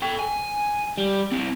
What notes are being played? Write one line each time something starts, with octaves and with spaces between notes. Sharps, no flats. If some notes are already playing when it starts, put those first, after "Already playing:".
A4 G5
G#5
G3
C4 E4